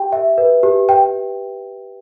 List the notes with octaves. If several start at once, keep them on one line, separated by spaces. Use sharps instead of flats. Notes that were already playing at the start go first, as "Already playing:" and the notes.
Already playing: G4 G5
E5
B4
G4
G5